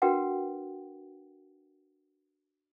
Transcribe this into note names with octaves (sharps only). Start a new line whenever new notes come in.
D4 F#4 A#4 B4 F#5 G5